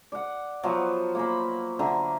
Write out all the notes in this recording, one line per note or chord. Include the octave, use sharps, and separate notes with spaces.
D5 F#5
F3 F#3 B3
A#3 C5 B5
D3 E5 A#5